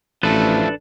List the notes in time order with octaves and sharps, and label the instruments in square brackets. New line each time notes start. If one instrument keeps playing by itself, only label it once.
[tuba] A1 [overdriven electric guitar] F3 A3 [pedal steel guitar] D4 A4 B4